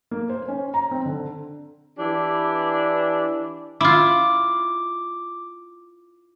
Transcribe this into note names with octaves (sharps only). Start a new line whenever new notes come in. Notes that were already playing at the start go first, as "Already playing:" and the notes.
A#3
C5
C#4
A#5
C4
D3
E3 D4 E4 G4
E4 F4 D6